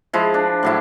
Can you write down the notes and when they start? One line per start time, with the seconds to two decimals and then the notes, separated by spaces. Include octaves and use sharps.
0.13 F3 G#3 E4
0.34 D4
0.63 A2 F#3 E4